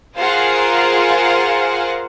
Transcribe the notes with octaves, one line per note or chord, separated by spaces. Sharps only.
F4 G#4 A#4 C5 F5 F#5